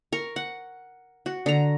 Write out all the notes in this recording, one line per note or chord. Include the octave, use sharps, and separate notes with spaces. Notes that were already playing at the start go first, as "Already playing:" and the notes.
A#4 C#6
F#5
F#4
D3 A#5